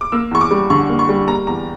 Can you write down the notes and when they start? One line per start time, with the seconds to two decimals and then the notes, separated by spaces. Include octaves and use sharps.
0.01 D6
0.12 A#3 E6
0.31 E2 C#6
0.41 D6
0.51 G3
0.70 D3 C#6
0.89 A#3
0.99 C#6
1.09 G3
1.28 A#3 A#5
1.47 E2 A#5